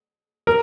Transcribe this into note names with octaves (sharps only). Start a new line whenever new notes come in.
A#4